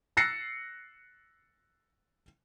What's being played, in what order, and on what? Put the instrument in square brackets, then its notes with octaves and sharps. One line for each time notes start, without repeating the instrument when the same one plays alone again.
[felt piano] E6 F#6 A6 A#6 C7 C#7